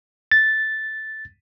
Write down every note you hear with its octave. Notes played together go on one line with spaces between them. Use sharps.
A6